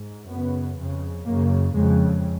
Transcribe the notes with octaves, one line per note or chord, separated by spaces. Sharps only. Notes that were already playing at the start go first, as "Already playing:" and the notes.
Already playing: G#2
F#2 C#3 B3
F2 C#3
F#2 C#3 A#3
F2 C#3 G#3